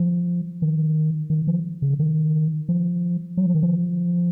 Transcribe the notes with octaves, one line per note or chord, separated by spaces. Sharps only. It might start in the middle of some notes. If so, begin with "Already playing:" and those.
Already playing: F3
D#3
D#3
F3
C#3
D#3
F3
F#3
F3
D#3
F3